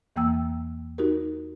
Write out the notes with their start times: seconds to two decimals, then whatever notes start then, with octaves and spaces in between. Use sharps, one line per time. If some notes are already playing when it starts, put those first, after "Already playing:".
0.16 E2 E3 A#3 G5 E6
0.98 D#4 F#4 G4 A#4